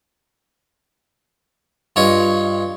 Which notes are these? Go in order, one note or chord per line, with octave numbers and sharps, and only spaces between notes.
G2 F4 C#5 D#5